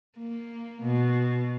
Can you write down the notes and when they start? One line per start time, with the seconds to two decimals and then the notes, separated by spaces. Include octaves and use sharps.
0.18 A#3
0.82 B2